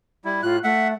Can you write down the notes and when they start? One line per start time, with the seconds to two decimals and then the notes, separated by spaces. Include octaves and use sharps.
0.25 G3 E4
0.43 A2 F4 F#6
0.64 A3 E5 F#5